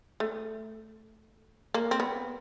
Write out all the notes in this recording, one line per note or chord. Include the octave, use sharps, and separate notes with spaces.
A3
A#3
C4
B3